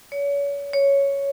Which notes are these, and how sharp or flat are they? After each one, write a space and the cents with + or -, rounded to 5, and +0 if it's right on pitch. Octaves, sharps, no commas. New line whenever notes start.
C#5 +35
C#5 +5